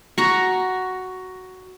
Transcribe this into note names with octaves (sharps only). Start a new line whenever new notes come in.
F#4 A#5 C#6